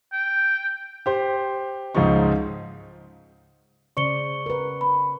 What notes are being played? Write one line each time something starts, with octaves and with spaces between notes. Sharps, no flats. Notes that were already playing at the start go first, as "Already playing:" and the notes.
G5
G4 C5 C6
C#2 G#2 F3 D#4 C#6
C#3 C5 D5 C#6 C#7 G7
A#4 B4
B5